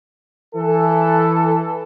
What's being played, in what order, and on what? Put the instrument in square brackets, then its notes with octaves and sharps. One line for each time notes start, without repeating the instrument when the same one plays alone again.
[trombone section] E3 A4